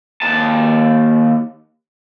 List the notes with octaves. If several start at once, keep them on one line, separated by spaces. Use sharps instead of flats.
D#2 A5